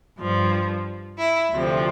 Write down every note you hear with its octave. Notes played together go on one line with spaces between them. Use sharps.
G2 F3
E4
D2 C3 F3